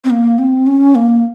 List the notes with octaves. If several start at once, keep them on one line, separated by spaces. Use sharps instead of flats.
C4
A#3
C4
C#4
A#3